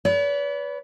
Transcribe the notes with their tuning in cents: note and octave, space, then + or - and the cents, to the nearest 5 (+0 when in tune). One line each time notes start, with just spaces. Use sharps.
B4 +0 D5 -45